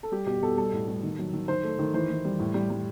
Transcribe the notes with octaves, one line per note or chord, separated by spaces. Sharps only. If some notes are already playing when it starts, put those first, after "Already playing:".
A4
G3 G4
B2 G4
B2 A4
G3 A4
A2
G3
D#3
F#3
D#3
D#3 C5
A3
D#3
E3 C5
E3
G3
A2
G3
G3